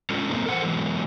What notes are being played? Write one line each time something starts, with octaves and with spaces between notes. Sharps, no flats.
G#3 C#4 D4 F4 A4
F#2 A#2 A3 A#3 C4 D#4
A4 A#4 C5 F#5
E3 F#3 G#3 B3